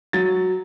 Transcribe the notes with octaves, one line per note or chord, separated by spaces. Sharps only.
F#3 A6